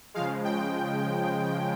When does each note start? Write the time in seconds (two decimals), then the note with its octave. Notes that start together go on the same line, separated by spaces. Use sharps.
0.14 C#3 F3 G#3 F5
0.45 G5